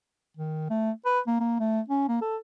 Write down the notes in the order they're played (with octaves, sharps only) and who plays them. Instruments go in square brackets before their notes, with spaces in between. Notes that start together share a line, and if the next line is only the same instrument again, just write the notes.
[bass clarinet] D#3
A3
B4
A#3
A#3
A3
C#4
A#3
A4